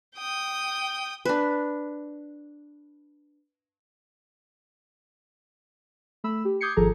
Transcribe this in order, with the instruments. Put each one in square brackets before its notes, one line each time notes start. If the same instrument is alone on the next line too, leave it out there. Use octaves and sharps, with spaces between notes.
[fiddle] G5 D#6
[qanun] D4 B4
[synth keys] A3 B5 E6
G4
D6 D#6 G6 G#6 C7 C#7
G#1 F3 G#4 A4 A#5